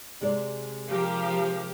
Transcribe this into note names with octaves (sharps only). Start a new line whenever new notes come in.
C3 G#3 D5
F3 G4 A#4